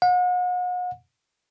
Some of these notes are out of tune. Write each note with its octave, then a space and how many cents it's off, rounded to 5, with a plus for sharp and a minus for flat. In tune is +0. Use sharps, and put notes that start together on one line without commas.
F#5 -40